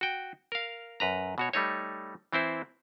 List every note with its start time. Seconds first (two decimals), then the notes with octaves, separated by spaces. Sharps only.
0.01 F#4 G5
0.52 A#4 F5
1.00 F#2 B4 A#5
1.38 B2 F#4 C#5
1.53 G3 A3 D#4 C#5
2.33 E3 C4 E4 C5